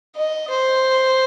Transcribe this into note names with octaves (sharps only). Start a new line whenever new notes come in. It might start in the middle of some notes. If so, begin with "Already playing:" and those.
D#5
C5